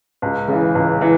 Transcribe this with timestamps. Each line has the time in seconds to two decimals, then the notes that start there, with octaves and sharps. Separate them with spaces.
0.22 C#2
0.48 C#3 E3
0.75 C#2
1.01 E3